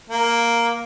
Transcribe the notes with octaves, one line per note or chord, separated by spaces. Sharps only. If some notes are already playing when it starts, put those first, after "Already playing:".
A#3